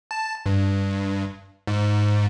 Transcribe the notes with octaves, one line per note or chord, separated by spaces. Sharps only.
A5
G2
G#2